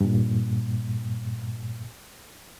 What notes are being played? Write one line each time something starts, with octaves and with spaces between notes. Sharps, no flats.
G2 A#2